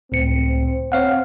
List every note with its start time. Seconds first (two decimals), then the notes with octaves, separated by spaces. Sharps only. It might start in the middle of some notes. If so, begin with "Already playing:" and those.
0.12 C#2 A2 C4 C#7
0.92 C4 C#5 F5 F#5